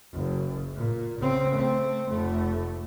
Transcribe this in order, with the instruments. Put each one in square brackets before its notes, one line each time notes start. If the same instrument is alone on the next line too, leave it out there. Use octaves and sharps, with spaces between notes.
[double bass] F#1
A#2
C#3 C4
A3 C4
F1 A3